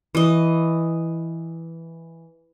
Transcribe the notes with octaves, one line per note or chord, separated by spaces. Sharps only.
E3 D#5